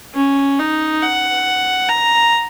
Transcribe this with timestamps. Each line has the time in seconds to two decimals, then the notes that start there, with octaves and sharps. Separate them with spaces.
0.15 C#4
0.59 D#4
1.02 F#5
1.89 A#5